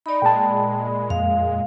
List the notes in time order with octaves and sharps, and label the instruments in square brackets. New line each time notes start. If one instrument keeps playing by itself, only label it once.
[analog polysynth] D#4 [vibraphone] D5 B5
[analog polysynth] A#2 G#3 [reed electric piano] G5 A5
[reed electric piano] F2 [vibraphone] F5